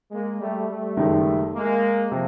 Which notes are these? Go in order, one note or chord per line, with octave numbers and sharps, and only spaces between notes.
G#3 A#3
G3 A3
G3 A3
F#1 F#2 D#3 G#3
G#3 A#3
C3 F3